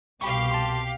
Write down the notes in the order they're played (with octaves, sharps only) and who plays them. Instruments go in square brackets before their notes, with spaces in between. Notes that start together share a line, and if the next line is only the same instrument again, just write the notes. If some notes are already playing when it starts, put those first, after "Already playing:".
[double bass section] C2 B2 [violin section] G4 F5 [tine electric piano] B5 C#6
[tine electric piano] A5 C6